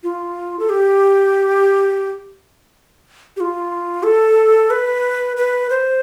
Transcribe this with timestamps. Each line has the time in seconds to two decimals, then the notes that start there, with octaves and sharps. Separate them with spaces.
0.03 F4
0.59 A4
0.69 G4
3.37 G4
3.40 F4
4.03 A4
4.70 B4
5.37 B4
5.70 C5